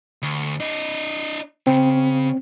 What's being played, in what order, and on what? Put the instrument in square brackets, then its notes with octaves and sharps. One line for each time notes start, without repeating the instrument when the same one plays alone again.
[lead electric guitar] D2
D4 D#5
[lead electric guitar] C#3 [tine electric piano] C4